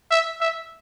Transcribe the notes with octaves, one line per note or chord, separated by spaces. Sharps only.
E5
E5